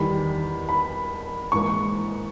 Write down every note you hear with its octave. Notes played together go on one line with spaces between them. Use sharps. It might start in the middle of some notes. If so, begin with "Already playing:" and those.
Already playing: E2 D#3 G3 B5
B5
G#2 E3 A#3 C#6